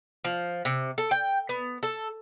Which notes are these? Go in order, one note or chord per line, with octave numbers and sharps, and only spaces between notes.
F3
C3
A4
G5
B3
A4